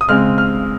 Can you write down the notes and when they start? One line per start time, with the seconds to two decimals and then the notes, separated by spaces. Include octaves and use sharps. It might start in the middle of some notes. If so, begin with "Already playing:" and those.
0.01 D#6
0.09 C#3 G#3 C4 F6
0.38 F6